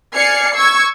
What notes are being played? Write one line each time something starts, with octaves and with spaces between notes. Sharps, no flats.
D5 G#5 F6 G#6 C7 C#7
C#6 E6 G#6